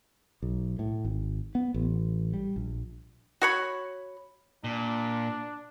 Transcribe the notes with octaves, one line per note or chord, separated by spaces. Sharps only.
B1
A2
G#1
B3
A1
G3
A#1
F#4 C#5 B5
A#2 D4